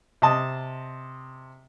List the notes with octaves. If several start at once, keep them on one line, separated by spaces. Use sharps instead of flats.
C3 D#5 A5 D#6